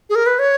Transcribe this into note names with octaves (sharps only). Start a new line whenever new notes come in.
G#4
A#4
B4
C#5